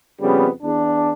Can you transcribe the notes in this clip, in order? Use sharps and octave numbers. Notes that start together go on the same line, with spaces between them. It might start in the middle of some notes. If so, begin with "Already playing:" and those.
F2 C#3 G3 B3
E2 D4